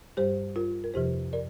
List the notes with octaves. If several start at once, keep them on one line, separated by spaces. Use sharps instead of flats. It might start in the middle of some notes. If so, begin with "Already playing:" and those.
G2 G3 G4 C5
F4 A#4
A#4
F2 C3 F3 G4 C5
A#4 D5